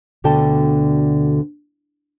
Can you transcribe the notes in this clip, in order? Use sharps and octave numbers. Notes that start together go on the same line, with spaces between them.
D2 B2 D3 A4 G5 A5